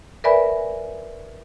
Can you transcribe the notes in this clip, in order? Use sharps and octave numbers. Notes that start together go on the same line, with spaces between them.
A#4 B4 D5 E5 G#5 B5